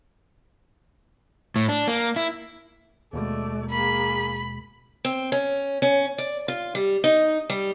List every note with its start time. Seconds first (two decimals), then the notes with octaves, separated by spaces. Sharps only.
1.56 A2
1.69 D4
1.88 A#3
2.16 E4
3.13 D#2 B2 G#3 A3 D5
3.70 A#3 G#4 B5
5.05 C4
5.32 C#4
5.82 C#4
6.18 D5
6.48 F4
6.75 G3
7.04 D#4
7.50 G3